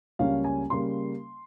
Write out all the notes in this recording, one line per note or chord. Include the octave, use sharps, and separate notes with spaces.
C#2 C#3 G3 A#3 C#4 F5
G#5
C#3 G3 A#3 C6